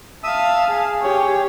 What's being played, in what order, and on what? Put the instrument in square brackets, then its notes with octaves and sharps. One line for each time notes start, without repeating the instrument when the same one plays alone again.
[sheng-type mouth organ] E5 D#6 E6 [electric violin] F5 A5
[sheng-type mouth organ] G#4
[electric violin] G4 C#5